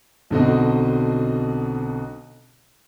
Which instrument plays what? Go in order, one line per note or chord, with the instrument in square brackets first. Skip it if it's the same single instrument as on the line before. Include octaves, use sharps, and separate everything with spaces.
[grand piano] B1 B2 D3 C4 F#4 D#5